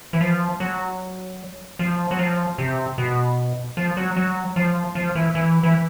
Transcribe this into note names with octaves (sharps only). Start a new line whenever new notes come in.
E3
F3
F#3
F3
F#3
F3
C3
B2
F3
F#3
F#3
F3
F3
E3
E3
E3